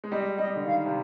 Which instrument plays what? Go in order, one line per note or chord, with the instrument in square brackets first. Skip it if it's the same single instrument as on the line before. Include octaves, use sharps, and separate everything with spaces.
[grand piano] G#3
[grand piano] G3 [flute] D#5
[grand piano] G3 [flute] D#5
[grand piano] D3
[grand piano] D#3 [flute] F5
[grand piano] C3